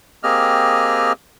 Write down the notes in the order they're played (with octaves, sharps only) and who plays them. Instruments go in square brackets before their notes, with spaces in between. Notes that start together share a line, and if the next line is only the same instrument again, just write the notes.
[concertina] A#3 C4 G4 G#4 D#5 F6